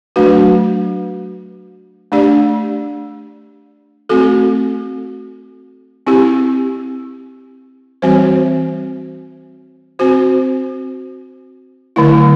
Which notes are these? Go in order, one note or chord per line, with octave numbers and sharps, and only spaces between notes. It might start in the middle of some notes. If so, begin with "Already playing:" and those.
F#3 A3 D4 F#4 B4
A3 D4 G4 D5
A3 C4 F#4 A4
C4 E4 G4
E3 G3 C4 F#4 C5
C4 F#4 C5
D3 F#3 A3 E4